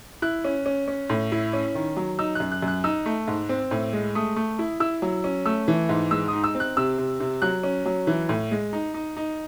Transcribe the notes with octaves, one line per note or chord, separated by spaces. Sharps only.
E4 F#6
C#4
C#4
C#4
A2
E4
C#4
D#3
F#3
D#4 E6
F#2 F#6
F#6
F#2
F#6
D#4 E6
A3
G#2
C4
A2
G#3
A3 D#6
A3
E4
E4 E6
F#3
C#4
A3 E6
E3
G#2
G#3 E6
D#6
D#4
E6
C4
F#6
C3 E6
C3
C3
F#3 F#6
C#4
F#3
E3
A2
G#3
D#4
D#4
D#4